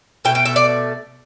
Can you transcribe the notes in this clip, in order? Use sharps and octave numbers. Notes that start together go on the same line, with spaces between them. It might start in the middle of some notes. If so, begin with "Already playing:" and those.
B2 A3 G5
G5
E5
D5